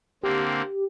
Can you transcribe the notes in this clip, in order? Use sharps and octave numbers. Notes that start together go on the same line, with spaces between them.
D3 A#3 C4 G4